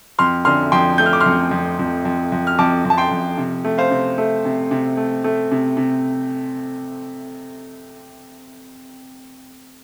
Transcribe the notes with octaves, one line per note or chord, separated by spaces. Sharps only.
F2 C6 F6
D3 C6 F6
F2 G5 C6
A3 G6
F6
D6
C6 F6
F2
F2
F2
F2
F2
F6
F2 A5 D6
F2
A5
G5 C6
F2
C3
A3
C5 F5
C3
A3
C3
C3
A3
A3
C3
C3